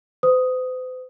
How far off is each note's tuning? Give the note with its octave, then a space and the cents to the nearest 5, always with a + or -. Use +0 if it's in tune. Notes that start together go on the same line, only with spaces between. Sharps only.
C5 -45 D#6 +0